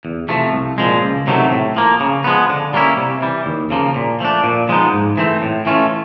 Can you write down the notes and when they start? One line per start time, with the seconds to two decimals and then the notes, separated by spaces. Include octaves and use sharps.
0.05 E2
0.29 C3 F3 A3
0.53 C2
0.78 A#2 F3 G#3
1.02 C#2
1.27 C3 D#3 F#3 A3
1.52 A2
1.76 F3 A#3
2.00 C#3
2.24 F3 G#3 B3
2.50 D3
2.73 G3 A#3 C#4 E4
2.97 C3
3.22 E3 G3
3.46 D#2
3.71 C#3 F3 A#3
3.96 A#2
4.20 F3 A3 D4
4.44 A#2
4.69 F3 G#3 B3 D#4
4.94 G#2
5.17 E3 A3 C4
5.42 A2
5.66 E3 A3 C#4 F4